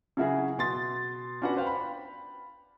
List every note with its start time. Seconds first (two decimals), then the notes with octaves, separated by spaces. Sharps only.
0.17 C#3 F#3 E4 F#4 G#4
0.58 B2 C6 A6
1.42 C#4 D4 F#4 B4 F#5
1.55 B4 C5 F5 G5
1.67 B5